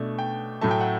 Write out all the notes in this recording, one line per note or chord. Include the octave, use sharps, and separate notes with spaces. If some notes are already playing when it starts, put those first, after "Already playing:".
Already playing: B2 A3 D4
G5
A2 F#3 A3 A5
G5
F#5